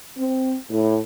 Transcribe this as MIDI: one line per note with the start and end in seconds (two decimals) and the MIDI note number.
0.18 0.55 60
0.70 0.98 45